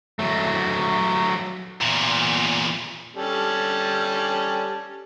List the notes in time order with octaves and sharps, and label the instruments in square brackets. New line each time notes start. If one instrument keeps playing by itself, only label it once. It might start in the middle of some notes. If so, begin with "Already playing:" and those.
[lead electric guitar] F#3 A3
[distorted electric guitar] E2 A#2
[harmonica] G3 C#4 A4